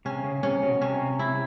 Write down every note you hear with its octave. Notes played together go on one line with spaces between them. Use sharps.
C3 C#4
C#3
C3 C#4
B2
C3 C#4
E4